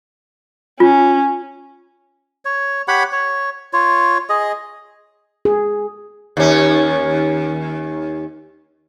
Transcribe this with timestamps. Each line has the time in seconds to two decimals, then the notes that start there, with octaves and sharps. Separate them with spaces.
0.80 C#4 F4
2.45 C#5
2.88 G4 C#5 F#5 B5
3.12 C#5
3.73 F4 C#5
4.29 G#4 D#5
5.45 G#4
6.37 D#2 C#4